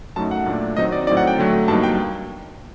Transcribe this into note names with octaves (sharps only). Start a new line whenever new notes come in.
F#2 F#3 A3 D#4 A5
F#5
A#2 A3 D4
D#3 F#3 C4 D#4 D#5
D5
A2 F#3 C4 D#4 D5
F#5
G5
D3 F#3 A3
G2 F#3 A#3 D#4 A5
G5